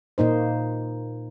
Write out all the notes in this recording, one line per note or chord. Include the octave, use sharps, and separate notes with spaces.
A#2 A#3 D#4 C5